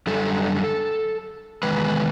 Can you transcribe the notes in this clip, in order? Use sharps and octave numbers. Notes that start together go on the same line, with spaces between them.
F#2 D3 G3 A4
E2 C3 D#3 G#3 B4